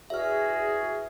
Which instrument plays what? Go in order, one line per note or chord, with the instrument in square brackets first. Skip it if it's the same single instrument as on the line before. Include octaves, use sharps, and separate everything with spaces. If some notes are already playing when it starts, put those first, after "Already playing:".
[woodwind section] E2 F#4 [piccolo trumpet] G#4 [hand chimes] E5 F6